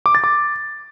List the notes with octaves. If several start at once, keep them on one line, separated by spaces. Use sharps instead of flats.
D6
A6
D6